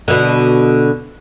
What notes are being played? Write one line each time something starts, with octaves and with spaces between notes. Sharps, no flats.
B2 D3